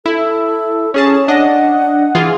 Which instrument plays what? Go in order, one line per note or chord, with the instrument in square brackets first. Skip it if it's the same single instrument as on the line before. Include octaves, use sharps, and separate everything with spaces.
[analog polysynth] E4 [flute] A4
[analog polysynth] C#4 G#4 A5 [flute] C#5
[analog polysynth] D4 D#5 [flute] F#5
[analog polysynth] E3 F4 G#4